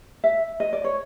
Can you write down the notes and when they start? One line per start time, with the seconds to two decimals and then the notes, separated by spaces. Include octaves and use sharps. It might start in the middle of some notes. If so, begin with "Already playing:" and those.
0.24 E5
0.60 D#5
0.73 D5
0.84 C#5